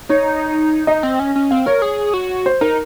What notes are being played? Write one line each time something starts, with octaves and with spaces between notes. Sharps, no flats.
D#4 C#5
D#4 D#5
C4
C#4
C#4
C4 F5
A#4 C#5
G#4
F#4
C5
D#4 A#4